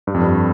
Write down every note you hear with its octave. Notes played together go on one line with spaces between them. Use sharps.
G2
F2
G2